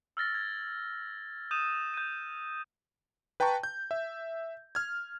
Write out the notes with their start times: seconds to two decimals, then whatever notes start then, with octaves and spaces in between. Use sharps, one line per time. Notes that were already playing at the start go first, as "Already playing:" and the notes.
0.17 E6 F6 A6 A#6
0.35 G#6
1.51 D#6 G6 D#7 E7
1.94 G6 D#7
3.40 B4 G5 A5 A#5 C#6
3.63 G6
3.91 E5
4.75 F6 G#6